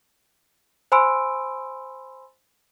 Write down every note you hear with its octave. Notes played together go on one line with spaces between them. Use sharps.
C5 G#5 B5 C6 E6 D7